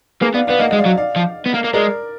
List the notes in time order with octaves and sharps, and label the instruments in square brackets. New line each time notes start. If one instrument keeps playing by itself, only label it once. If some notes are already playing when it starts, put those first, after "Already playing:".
[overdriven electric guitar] A#3 [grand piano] G#4 B4
[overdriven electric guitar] B3 [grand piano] D5 F5
[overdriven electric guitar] B3 [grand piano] D5 F5
[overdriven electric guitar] A#3 [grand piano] D#5 F#5
[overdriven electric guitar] G#3 [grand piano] D#5
[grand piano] D5 F5
[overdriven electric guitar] F#3
[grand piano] D5 F5
[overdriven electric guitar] F3
B3
A#3
A#3
[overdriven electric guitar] G#3 [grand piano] A#4 D5